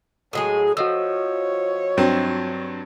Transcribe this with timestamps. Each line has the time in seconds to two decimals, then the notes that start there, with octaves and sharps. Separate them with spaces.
0.33 A2 F#3 G#3 G#4
0.77 F3 F#4 C#5 D#5 E6
1.97 G2 F#3 C4